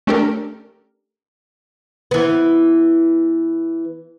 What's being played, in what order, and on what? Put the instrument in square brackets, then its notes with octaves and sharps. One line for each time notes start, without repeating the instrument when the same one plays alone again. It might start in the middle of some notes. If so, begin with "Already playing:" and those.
[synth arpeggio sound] A3 C#4 D4 G4 A4 A#4
[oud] E3 B3